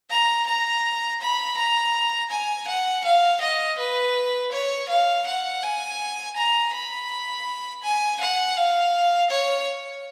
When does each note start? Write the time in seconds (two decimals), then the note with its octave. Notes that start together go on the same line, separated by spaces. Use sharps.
0.10 A#5
0.47 A#5
1.21 B5
1.57 A#5
2.31 G#5
2.68 F#5
3.04 F5
3.41 D#5
3.79 B4
4.52 C#5
4.89 F5
5.26 F#5
5.63 G#5
6.37 A#5
6.74 B5
7.83 G#5
8.20 F#5
8.57 F5
9.30 C#5